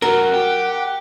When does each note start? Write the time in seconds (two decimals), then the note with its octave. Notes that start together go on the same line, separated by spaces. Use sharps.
0.02 F#2 F#3 A#4 F#5
0.34 G4